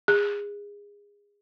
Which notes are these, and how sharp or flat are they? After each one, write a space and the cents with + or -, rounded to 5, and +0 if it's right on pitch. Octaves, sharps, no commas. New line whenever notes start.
G#4 -25